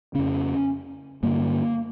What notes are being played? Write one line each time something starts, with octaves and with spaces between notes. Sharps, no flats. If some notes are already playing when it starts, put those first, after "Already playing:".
F2 C#3 C#4
G2 D3 A#3